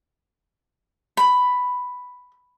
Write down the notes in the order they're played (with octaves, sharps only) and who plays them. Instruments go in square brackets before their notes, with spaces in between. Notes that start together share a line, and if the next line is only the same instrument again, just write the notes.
[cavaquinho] B5